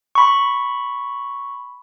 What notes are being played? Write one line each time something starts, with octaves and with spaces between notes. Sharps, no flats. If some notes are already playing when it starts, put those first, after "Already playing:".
B5 C#6